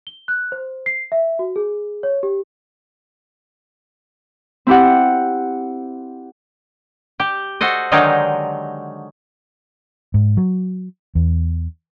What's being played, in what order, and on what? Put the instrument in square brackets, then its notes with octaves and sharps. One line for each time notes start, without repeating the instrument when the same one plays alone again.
[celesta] G7
F#6
C5
C7
E5
F#4
G#4
C#5
G4
[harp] C4 E4 G4 F#5
[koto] G4
F#4 A4 C5 D#5
D3 D#3 F#3 G#3 D#4 G4
[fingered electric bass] G#2
F#3
E2